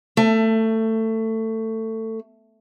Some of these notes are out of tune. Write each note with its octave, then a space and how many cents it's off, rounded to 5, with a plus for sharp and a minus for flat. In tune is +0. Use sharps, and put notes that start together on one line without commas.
A3 +20